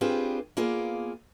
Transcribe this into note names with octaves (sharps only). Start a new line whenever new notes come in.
C4 D4 F4 G4 G#4 B4
A#3 B3 F4 G#4 D5